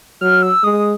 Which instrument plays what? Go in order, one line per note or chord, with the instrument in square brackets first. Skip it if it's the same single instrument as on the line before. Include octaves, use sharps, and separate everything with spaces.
[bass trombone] F#3 [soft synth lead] F6
[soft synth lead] E6
[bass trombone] G#3 [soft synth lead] D#6